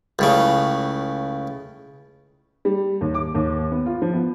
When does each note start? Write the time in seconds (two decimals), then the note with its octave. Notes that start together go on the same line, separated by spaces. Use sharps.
0.19 C#2 A2 C#3
2.65 G3
3.01 D#2
3.14 D6
3.35 D#2
3.71 B3
3.86 F4
4.02 F3
4.14 B3